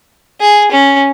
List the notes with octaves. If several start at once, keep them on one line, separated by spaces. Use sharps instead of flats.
G#4
C#4